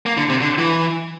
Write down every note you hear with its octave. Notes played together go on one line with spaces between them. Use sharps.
A#3
D3
C3
D3
E3